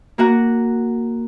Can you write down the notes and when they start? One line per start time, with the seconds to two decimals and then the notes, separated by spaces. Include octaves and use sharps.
0.18 A#3 F#4 F#5 A#5